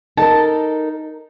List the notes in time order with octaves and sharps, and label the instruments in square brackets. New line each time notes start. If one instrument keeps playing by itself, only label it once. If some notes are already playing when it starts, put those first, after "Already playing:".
[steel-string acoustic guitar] D#4 A4 A#4 [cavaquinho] A5